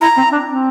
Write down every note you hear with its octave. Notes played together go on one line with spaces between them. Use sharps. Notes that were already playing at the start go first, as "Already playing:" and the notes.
E4 A#5
C4
D4
C4